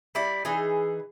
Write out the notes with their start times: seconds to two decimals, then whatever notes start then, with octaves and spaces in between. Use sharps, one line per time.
0.15 G3 E4 D5
0.45 E3 D#4 G#4